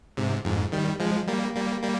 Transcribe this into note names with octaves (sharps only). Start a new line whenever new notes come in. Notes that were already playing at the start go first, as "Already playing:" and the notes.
G#2 C3
F2 G#2
D#3 G3
F3 G#3
G3 A#3
G3 A#3
G3 A#3